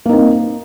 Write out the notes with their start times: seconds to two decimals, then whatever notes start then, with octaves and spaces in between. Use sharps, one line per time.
0.06 A#3
0.09 D#4
0.13 C4